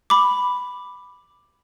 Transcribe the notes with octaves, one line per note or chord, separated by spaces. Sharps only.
B5 D6